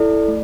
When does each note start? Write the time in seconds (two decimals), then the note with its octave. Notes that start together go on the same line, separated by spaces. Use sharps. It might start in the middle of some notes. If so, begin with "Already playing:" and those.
Already playing: E4 A4 D5
0.28 A3